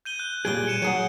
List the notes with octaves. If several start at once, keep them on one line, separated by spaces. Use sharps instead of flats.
G6 D#7 G7
F#6
A#2 G3 G#4 D7 G7
C#7 D#7 E7
F#3 G#4 F#5